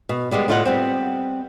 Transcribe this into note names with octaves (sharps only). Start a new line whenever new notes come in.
B2
D3 G3 G#3 B3
A2 D3 F4 D#5 E5 F#5
G3 B3 C4